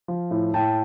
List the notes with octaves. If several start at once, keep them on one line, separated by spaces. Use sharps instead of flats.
F3
A2
A2 G5 A5